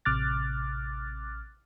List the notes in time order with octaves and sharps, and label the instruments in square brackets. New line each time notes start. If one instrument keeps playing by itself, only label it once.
[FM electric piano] A1 C3 D6 F6 F#6 A6